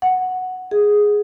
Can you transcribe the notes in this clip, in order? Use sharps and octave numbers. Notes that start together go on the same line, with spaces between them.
F#5
G#4